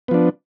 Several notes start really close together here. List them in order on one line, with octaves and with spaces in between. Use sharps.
B3 F3 D4